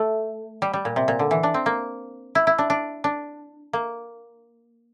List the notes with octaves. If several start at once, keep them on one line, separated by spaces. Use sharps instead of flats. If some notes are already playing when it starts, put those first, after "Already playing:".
Already playing: A3
G3
G3
A#2
C3
A#2
D3
E3
D4
C4
A#3
E4
E4
D4
D4
D4
A#3